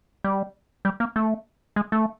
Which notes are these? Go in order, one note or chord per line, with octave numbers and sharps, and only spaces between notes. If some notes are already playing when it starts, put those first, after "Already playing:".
G3
G3
A#3
A3
G#3
A3